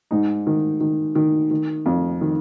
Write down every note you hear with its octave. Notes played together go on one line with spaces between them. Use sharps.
G#2 D#4
D#3
D#3
D#3
D#3
F2
D#3